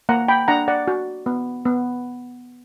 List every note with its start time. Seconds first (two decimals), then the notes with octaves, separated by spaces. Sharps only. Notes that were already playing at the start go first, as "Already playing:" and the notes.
0.09 A#3 F#5 A#5
0.28 G5 B5
0.48 D4 F#5 A#5
0.68 D5 F#5
0.88 F#4
1.26 B3
1.65 B3